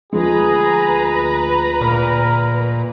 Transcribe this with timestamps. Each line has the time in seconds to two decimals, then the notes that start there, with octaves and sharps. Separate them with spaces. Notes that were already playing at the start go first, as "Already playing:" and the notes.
0.13 D2 F3 G#3 G#4 B4 A#5
1.81 A#2 A#4